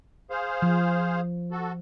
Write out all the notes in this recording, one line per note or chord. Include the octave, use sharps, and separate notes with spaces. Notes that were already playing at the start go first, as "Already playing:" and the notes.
G#4 C5 F5
F3
F#4 A4